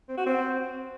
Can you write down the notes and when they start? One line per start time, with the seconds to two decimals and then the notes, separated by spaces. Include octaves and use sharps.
0.08 C4
0.17 F#4
0.26 C4